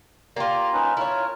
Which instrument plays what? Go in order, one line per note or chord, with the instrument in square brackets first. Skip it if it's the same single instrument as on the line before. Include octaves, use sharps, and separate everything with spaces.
[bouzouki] A#3 F4 [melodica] G4 D5
[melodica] C#4 D#4 B4
[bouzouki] E4 C#5 [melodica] F4 A#4